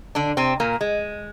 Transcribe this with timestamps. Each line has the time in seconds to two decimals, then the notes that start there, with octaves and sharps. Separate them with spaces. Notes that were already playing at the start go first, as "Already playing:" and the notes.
0.15 D3 D4
0.37 C3 C4
0.60 A#2 A#3
0.81 G#3